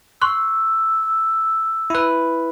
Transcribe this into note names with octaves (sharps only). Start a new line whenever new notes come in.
C6 C#6 E6 F#6
E4 B4